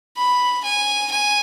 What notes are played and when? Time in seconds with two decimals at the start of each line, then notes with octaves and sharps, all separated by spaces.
0.17 B5
0.64 G#5
1.11 G#5